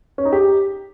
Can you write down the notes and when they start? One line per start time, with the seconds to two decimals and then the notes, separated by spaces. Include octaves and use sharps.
0.18 C#4
0.25 D#4
0.32 G4